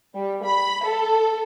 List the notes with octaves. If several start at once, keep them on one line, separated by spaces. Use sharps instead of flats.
G3
B5
A4